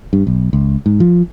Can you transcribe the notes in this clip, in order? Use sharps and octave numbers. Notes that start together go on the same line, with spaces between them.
G2
B1
C#2
G#2
F3